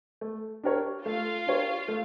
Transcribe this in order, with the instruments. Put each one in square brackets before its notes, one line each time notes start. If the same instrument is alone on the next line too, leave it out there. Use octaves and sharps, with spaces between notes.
[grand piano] A3
D4 G4 A#4 C#5
[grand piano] A3 [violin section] F4 F5
[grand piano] D4 G4 A#4 C#5
A3